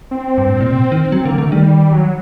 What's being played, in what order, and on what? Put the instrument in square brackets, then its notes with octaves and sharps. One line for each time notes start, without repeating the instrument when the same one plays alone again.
[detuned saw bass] C4
[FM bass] G2
A2
A#2
C3
D#3
[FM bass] F#3 [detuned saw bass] C4
[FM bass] D3 [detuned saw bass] A#3
[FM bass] D3 [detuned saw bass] A3
[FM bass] D#3 [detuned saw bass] G3
[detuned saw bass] F#3